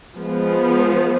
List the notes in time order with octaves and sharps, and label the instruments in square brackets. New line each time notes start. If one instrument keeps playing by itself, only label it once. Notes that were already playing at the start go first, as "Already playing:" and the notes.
[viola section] F3 G#3 B3